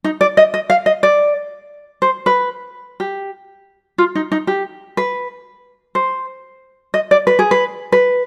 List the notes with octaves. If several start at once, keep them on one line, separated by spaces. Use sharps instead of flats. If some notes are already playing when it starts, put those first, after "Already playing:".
D#4
D5
D#5
D#5
F5
D#5
D5
C5
B4
G4
F4
D#4
D#4
G4
B4
C5
D#5
D5
B4
G#4
B4
B4